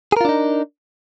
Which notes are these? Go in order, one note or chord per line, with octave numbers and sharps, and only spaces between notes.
D4 D#4 F4 G#4 A#4